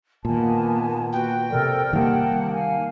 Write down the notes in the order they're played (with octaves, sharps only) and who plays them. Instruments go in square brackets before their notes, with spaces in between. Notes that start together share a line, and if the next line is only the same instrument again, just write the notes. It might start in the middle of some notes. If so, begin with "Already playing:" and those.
[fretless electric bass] A#2 [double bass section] D#3 A#3 B3 [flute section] G#5 A5
[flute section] F#4 B4 [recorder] G5
[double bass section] C3 [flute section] A4 A#4 D5
[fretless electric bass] D#3 G3 [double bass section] A#3 [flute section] F#5 A5
[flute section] F5 G#5